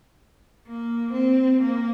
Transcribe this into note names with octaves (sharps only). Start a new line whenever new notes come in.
A#3
C4
A#3